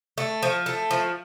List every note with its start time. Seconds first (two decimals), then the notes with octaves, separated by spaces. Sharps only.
0.18 A3
0.42 F3
0.66 A3
0.91 F3